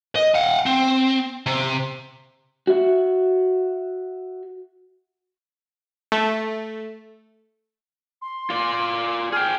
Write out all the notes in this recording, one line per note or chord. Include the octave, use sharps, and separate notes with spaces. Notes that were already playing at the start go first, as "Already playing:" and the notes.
D#5
F5 F#5
C4
C3
F#4 E5
A3
C6
F4 D5
G#4 G5 F6